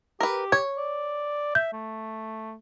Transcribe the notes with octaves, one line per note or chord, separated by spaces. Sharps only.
G4 A#4 B4
C#5 G#6
D5
E5 G6
A3